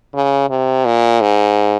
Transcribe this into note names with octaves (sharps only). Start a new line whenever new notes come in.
C#3
C3
A#2
G#2